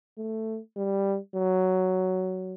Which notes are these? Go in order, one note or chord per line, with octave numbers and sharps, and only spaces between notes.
A3
G3
F#3